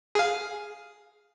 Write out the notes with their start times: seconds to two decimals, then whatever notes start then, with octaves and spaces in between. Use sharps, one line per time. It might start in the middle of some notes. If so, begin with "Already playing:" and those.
0.15 G#4 F5